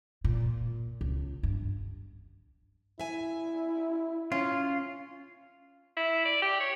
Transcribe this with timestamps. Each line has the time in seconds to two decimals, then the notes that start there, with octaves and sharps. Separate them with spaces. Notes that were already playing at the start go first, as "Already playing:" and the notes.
0.24 A#2
1.01 C#2
1.43 G2
3.00 E4 E5 G#5
4.32 C#4 F4
5.97 E4
6.25 D5
6.42 G4
6.61 C#5